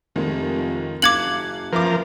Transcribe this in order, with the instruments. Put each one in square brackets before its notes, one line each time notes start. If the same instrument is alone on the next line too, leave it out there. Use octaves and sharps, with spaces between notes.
[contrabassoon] F1 [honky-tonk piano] F2 D#3 G#3
[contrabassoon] F#1 [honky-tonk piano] F5 F#6 C#7 [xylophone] D6 G#6 F#7
[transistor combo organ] F3 A#4 [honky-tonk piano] B4 E5 D6